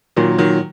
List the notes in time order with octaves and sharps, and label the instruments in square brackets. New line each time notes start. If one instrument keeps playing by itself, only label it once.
[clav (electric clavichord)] A#2 [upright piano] D#3 F#3
[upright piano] D#3 F#3